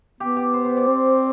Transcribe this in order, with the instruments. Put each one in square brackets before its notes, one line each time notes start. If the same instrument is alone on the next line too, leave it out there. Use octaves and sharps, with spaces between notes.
[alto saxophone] B3 [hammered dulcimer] G4
[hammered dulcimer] G4
C5
C5
D5
[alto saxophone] C4